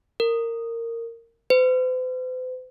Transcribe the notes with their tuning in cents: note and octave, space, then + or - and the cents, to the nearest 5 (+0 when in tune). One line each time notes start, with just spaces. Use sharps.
A#4 -20
C5 -45